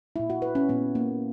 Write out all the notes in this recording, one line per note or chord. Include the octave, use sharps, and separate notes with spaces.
A#2 G#3 E4
F#4
B4
C#4
A#2 G#3 B3
A#3